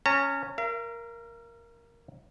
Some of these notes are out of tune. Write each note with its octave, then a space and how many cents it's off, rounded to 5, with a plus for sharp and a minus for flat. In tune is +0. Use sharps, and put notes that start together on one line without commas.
C#4 +0 A#5 -40
A#4 +5 F5 -45